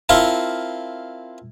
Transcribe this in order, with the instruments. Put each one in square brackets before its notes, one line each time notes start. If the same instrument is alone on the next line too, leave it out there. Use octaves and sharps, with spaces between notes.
[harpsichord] C4 E4 F4 A4 A#4